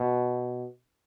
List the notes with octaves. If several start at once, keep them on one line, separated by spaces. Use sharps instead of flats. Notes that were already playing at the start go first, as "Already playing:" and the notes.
Already playing: B2